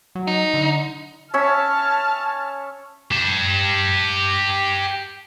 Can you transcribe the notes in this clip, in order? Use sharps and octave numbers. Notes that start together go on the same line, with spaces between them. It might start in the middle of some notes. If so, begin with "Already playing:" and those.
F#3
D#4
D3
C#4 E5 A5 F6
G4 A5